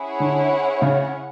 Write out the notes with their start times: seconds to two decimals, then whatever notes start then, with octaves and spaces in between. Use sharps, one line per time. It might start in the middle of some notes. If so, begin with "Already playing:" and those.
Already playing: C#4 E4 G#4 C#5 F#5
0.20 D3
0.82 C#3